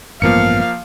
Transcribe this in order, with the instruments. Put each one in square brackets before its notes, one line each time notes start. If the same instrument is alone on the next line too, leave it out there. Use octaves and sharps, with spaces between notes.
[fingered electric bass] A1 G2 B3 [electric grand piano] F3 A#3 C#7 [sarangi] F5